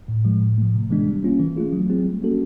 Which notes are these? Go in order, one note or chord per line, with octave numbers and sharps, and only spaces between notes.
A2
F3 G#3
A2
F3 A3
C3
E3 G#3 B3 D4
G3
A#3 C#4 F4
E3
A3 C#4 F4 G#4
F#3
A3 C4 F4 G#4
G3
A#3 C#4 F#4 A4